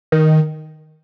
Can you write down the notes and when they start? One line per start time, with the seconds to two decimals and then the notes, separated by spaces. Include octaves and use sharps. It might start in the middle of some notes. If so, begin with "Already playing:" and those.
0.12 D#3